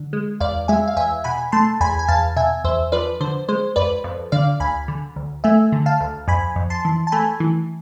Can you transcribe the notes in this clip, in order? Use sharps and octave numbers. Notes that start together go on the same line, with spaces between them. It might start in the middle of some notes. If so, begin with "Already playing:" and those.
Already playing: D3
G#3
E2 D5 F5
G#3 E5 G#5
F5
E2 E5 G#5
B2 G#5 B5
A3 A5 C6
E2 G#5 B5
G#5
E2 F5 A5
B2 E5 G#5
E2 C5 E5
F3 B4 D5
D3 C5
G#3 C5
F2 B4 D5
F2
D3 D5 F5
D2 G#5 B5
D3
D2
A3 E5 G#5
D3
F5 A5
D2
F2 G#5 B5
F2
A5 C6
E3
A5
A3 G#5 B5
E3